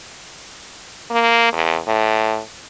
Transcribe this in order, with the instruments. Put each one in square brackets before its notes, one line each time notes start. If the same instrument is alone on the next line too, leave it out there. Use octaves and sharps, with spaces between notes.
[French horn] A#3
E2
A2